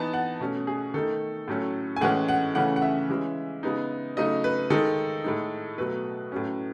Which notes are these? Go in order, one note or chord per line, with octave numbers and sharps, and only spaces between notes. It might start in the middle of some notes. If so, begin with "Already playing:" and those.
Already playing: E3 B3 D#4 A5
F#5
B2 A3 C#4
G#4
D#3 A3 D#4 A4
A2 F#3 A3 C#4
G#5
A2 E3 G#3 C#4 F#5
F#5
C#3 E3 A3 C#4 F#5
F#5
E5
E3 G#3 C#4
C#3 G#3 B3 D#4
C#3 F#3 A3 D#4 D#5
B4
D#3 G#3 D#4 A4
A2 G#3 D#4
B2 F#3 A3 B4
A2 F#3 C#4